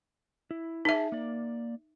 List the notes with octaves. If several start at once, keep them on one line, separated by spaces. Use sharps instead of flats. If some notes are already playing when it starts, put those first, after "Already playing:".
E4
D#4 G#4 E5 A5
A#3 D5